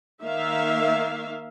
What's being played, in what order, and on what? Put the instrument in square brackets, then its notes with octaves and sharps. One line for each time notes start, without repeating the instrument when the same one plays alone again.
[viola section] D#3 A#3 E5 F5